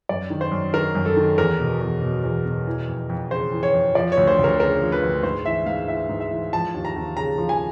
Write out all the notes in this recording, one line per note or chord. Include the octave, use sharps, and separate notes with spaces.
F#2 D5
D#3
C5
F#2
D#3 A#4
F#2
A4
D#3
E2 A#4
B2
E2
B2
E2
B2
E3
F2
F2
C#3 C5
E3
C#5
F2
F3 D5
C#5
D2
C5
D2
A#4
C#3 A#4
F3
B4
D2
G#2 C5
E3 E5
G#2 F5
E3 E5
G#2
E5
E3
F3 A5
D#2
A#5
D#2
C#3 A#5
F3
G#5